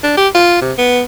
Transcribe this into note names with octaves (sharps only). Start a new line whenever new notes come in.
D4
G4
F4
C3
B3